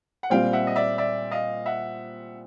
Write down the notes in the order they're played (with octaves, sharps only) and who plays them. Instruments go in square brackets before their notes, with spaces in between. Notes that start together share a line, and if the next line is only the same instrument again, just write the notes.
[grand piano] F#5
[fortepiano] A#2 G3 C4 [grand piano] F5 G5
[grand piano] E5 F#5
D#5
D5 E5
D5 E5
D#5 F5
E5 F#5